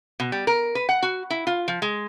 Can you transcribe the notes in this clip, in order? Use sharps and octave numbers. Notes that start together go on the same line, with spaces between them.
B2
G3
A#4
B4
F#5
F#4
E4
F4
F3
G#3